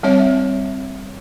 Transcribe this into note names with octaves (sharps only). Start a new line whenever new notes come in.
G3 C4 C#5 E5